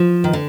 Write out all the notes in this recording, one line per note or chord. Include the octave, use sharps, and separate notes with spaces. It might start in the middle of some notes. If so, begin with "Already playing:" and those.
Already playing: F3
D#3
D3